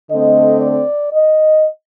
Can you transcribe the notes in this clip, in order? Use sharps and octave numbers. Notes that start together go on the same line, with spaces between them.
D3 A3 C4 D#5
D5
D#5